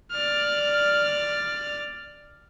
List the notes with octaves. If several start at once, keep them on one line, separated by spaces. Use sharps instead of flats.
D5 F6